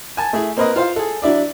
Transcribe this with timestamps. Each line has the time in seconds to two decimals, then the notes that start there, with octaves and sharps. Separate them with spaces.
0.17 G#5 A5
0.33 A3 E4 G#4
0.57 A#3 C4 A#4 B4 D#5
0.76 F4 C5 F5
0.96 G#4 A4
1.22 F#3 D4 E4 D5